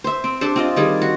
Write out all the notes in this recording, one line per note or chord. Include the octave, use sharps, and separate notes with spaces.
C5 E5
C4
D4 G4 A4 C5
C4 F4 D#5
D#3 G3 G#4 D5
F#4